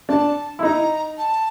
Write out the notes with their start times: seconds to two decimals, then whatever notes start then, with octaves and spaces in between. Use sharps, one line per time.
0.09 D4 A5
0.59 E4
0.63 D#4 A#5
1.18 A5